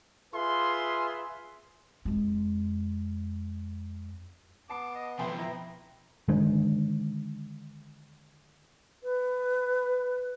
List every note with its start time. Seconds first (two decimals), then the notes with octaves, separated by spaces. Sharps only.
0.33 F4 G#4 B4 E5 C6
2.05 F2 G#3
4.70 B3 A5 D6 C7
4.95 D#5
5.19 F2 B2 B4 E5 G5 C6
5.38 E4 A#5
6.28 D3 D#3 G#3 D4
9.04 B4